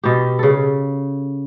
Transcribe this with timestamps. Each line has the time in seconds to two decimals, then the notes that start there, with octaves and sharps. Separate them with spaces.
0.04 B2 G4
0.39 C#3 A4